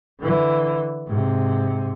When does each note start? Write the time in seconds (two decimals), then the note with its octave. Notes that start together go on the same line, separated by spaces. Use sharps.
0.21 D3 E3
1.08 G#2 C3